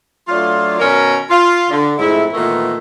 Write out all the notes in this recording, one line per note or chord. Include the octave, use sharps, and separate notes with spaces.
F#3 A3 D4 F4
B2 D#3 C#4 A#4
F4
D3
F2 G#2 A3 E4
A#2 D#3 E3 A3 B3